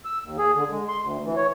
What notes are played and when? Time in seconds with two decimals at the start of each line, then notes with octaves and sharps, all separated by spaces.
0.05 E6
0.22 D#2
0.39 G#4
0.54 D3
0.70 G#3
0.88 C6
1.01 D2
1.24 E3
1.37 C#5